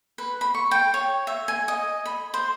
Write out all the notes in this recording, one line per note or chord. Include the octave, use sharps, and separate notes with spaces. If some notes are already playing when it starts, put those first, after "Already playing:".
B4
B5
C#6
G5
C#5
E5
G#5
D#5
B5
C5